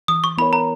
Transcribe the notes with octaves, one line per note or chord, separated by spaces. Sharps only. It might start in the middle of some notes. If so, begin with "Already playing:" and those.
E3 D#6
C#6
B3 E4 A#4 C#5 B5
A#5